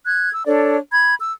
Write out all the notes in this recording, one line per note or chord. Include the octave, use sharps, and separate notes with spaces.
F#6 G#6
E6
D4 A4 C#5 D5
B5 G#6
E6